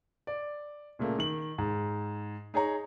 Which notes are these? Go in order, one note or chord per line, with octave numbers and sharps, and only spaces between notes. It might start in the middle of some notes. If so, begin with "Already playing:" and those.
D5
A#2 C#3 A3 A#3
D#3 F#7
G#2
D#4 G#4 C#5 A#5